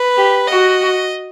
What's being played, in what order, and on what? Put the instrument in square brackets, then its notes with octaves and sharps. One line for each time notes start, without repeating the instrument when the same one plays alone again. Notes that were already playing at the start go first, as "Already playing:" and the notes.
Already playing: [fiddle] B4
[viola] G4
[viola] F#4 [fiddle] D#5